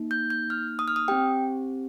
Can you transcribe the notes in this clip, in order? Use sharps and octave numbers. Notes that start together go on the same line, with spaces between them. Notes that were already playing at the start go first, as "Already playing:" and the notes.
Already playing: A#3 D#4
G6
G6
F6
D#6
F6
D#6
C4 G4 G5